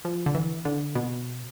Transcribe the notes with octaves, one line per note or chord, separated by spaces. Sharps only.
F3
D3
E3
D3
B2